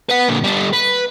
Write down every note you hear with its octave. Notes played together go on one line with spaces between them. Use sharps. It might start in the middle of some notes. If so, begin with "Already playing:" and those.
B4 F#5
A#2 D3
G3 A4
B4